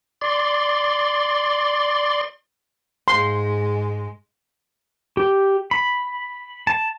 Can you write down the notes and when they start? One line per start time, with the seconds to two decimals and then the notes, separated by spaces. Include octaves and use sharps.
0.22 D5 C6
3.08 G#2 G#3 C6
5.17 G4
5.71 B5
6.67 A5